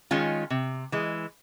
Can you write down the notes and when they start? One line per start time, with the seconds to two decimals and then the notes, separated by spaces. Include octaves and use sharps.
0.11 D#3 G#3 C#4 F4
0.50 C3
0.92 E3 G#3